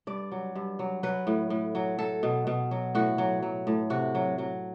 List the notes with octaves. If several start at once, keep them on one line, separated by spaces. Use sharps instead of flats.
G2 D5
F#3
G2
F#3
F#3 B4
A2
A2
F#3
F#3 A4
B2
B2
F#3
A2 F#4
F#3
F#3
A2
C3 F#4
F#3
F#3